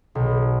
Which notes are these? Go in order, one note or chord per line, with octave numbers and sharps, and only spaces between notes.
B1